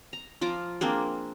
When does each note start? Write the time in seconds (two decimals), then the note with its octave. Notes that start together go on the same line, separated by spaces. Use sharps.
0.13 A#5
0.41 F3 F4 A#5 D6
0.81 A#3 C4 D4 G#4